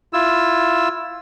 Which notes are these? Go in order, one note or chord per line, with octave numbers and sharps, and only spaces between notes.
E4 F4 E6